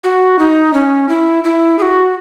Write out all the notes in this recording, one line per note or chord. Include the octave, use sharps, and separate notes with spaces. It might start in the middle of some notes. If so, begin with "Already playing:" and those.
F#4
D#4
C#4
E4
E4
G#4
F#4